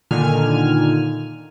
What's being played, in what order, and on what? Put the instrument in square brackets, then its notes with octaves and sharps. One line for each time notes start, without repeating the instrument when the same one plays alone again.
[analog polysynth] A#2 D3 D#3 G#5 F6